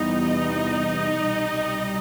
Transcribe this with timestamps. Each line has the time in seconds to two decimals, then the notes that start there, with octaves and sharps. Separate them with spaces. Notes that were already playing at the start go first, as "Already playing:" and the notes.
Already playing: E2 C3 E3 G3 B3 D#4 D#5
1.20 C2 B2 G3